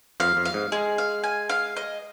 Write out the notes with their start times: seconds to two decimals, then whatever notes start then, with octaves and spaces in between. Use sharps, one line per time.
0.20 F2 F5
0.37 F2
0.45 F5
0.54 G#2
0.72 G#3 G#4
0.98 F5
1.24 G#5
1.49 F5
1.77 D#5